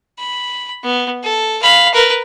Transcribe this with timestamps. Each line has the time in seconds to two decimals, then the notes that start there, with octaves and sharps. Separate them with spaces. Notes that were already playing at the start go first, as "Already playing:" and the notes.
0.19 B5
0.83 B3
1.23 A4
1.63 F5 B5
1.94 A#4 B4